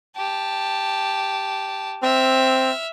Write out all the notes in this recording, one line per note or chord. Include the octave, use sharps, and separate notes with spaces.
G4 A5
C4 E5 F6